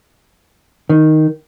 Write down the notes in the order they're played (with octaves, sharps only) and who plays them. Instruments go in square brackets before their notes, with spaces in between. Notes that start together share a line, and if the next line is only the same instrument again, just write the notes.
[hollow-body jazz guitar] D#3